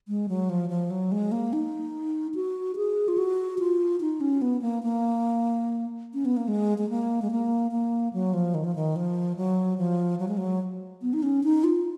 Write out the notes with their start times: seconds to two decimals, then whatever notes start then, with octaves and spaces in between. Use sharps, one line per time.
0.08 G#3
0.29 F#3
0.50 F3
0.70 F3
0.90 F#3
1.12 G#3
1.32 A#3
1.53 D#4
2.35 F#4
2.76 G#4
3.08 F4
3.18 F#4
3.59 F4
4.01 D#4
4.21 C#4
4.42 B3
4.62 A#3
4.83 A#3
6.14 C#4
6.25 B3
6.37 A#3
6.48 G#3
6.78 G#3
6.90 A#3
7.22 G#3
7.31 A#3
7.72 A#3
8.13 F#3
8.33 F3
8.54 D#3
8.64 F3
8.75 D#3
8.96 F3
9.37 F#3
9.78 F3
10.19 F#3
10.28 G#3
10.37 F#3
11.02 B3
11.13 D#4
11.23 C#4
11.44 D#4
11.64 F4